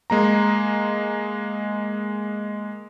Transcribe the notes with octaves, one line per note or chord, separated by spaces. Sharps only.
G#3 A#3 A#5